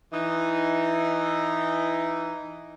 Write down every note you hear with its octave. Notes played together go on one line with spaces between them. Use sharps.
E3 D#4